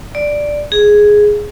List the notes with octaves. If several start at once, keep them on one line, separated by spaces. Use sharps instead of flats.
D5
G#4